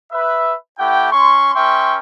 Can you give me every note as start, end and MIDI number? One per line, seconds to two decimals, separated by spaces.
0.12 0.54 71
0.12 0.54 76
0.78 1.10 57
0.78 1.10 64
0.78 1.10 67
0.78 1.10 78
0.78 1.10 79
1.11 1.51 61
1.11 1.51 84
1.11 1.51 85
1.54 1.99 61
1.54 1.99 70
1.54 1.99 76
1.54 1.99 79
1.54 1.99 84
1.54 1.99 85